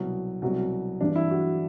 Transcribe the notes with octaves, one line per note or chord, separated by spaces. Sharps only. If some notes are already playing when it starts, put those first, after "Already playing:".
Already playing: C2 B2 F#3
C2 B2 F#3
G2 E3 D4
E4
F#4